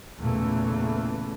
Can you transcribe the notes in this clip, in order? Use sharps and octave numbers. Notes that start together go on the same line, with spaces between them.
E2 A#2 C#3 E3 A3